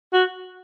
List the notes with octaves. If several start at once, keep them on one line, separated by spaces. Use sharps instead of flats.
F#4